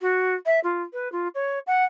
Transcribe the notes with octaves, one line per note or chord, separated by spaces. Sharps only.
F#4
E5
F4
B4
F4
C#5
F#5